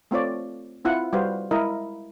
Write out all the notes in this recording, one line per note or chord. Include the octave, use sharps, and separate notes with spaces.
A3 C4 F4 C#5 D5
C4 E4 F4 F#5
G3 F#4 B4 C5 F5
G#3 E4 A#4 D#5 F5